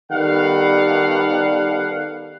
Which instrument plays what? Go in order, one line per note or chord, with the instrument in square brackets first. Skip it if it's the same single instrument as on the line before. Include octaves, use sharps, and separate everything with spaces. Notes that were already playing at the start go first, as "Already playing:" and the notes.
[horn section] D#3 G3 B3 A4 F5 F#5